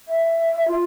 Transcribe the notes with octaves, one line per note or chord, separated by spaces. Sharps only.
E5
F4